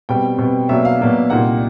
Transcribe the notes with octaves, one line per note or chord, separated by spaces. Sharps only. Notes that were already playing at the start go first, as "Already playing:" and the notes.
B2 G3 C4 G5
B2 G3 C4
B2 F#3 A#3 D4 E5
F5
B2 F#3 A#3 D4
C2 A#2 G3 A#3 D#4 F#5